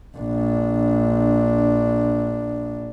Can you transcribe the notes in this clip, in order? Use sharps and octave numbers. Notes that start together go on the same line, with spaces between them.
A#1 D4